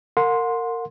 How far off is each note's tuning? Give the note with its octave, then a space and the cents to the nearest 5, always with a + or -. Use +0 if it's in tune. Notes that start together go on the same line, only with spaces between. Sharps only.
A#4 -25 F#5 -35 C6 +0